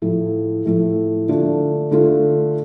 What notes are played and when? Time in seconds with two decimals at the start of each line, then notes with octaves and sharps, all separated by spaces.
0.02 A2 F3 A3 E4
0.65 A2 F3 A3 E4
1.28 D3 A3 D4 F4
1.91 D3 A3 D4 F4